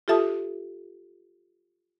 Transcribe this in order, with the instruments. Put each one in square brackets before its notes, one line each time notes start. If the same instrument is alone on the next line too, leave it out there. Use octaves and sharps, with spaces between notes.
[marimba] F4 G4 A4 E5 A5 D#6